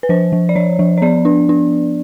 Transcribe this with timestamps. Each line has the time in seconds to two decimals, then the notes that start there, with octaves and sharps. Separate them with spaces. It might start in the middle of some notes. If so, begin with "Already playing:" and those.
0.03 B4
0.09 F3 C5
0.32 F3
0.49 D5
0.56 F3 C#5
0.79 F3
0.98 C#5
1.02 B3 D5
1.25 D4
1.49 D4